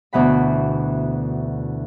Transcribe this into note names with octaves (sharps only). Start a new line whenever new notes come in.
D2 B2 E3 F#5 B5